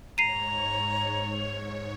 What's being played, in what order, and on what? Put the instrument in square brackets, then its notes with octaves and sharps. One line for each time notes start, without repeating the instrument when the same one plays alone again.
[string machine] G#2 C#5 [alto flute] A#5 [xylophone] C7 D#7 [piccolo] F7